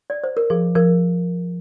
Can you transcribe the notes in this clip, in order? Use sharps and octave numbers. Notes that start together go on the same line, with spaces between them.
D5
C5
A#4
F3 G#4
F3 A#4